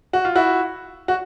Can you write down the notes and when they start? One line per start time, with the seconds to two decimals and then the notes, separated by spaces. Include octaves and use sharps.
0.13 F#4
0.25 F4
0.35 E4 F#4
1.08 F#4